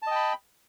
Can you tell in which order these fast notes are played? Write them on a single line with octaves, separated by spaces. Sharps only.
A5 D#5 G5 B5